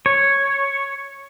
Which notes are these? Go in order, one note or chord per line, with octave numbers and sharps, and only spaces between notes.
C#5